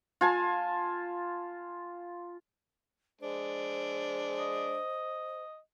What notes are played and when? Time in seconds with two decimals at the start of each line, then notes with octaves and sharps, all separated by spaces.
0.21 F4 G#5 A5
3.21 G#3 D4 C5
4.39 D#5